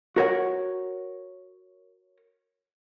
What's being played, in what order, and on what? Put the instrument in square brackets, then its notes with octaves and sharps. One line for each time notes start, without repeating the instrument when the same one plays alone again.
[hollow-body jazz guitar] F#4 A#4 C#5 F#5